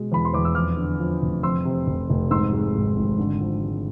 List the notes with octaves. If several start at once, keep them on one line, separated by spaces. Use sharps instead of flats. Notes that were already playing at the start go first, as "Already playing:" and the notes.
Already playing: B2 G#3
E2 B5
C6
E2 D6
E6
F2 D6 F6
D3
F3
F1
F2 C6 E6
C3
F1
F1
G#2 C6 E6
G#3
G#1
G#1
D3
F3
G#3